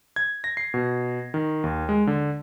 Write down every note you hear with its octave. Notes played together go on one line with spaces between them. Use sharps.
G#6
A#6
C7
B2
D#3
D#2
G#3
D3